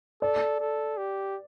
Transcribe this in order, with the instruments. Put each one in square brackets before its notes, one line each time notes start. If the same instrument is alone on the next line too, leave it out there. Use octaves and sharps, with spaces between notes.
[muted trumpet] A4 [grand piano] D5
[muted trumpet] A4
G4